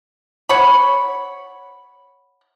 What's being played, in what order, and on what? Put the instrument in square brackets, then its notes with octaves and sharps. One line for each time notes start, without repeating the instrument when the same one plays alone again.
[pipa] C#5 F#5 B5